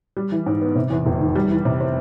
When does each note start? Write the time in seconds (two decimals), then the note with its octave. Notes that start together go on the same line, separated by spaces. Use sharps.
0.17 G3
0.32 E3
0.46 G#2
0.62 B3
0.75 C3
0.90 E2
1.06 F1
1.21 D#3
1.35 G3
1.50 E3
1.65 C3
1.81 C4